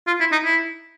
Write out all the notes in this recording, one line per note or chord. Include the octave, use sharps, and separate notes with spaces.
F4
E4
D#4
E4